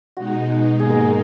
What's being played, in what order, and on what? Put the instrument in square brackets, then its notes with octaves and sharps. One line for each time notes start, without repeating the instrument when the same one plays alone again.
[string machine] B2 G#3 D#4 [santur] F#4
[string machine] G#2 D#3 A#3 D#4 [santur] G#4
[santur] A#4
G#4